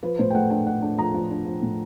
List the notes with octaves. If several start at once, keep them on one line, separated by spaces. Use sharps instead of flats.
F3 B4
A2 C5
G5
A3 F#5
D4 G5
D4 F#5
D4
F3 A#5
F3
D4
F3
A2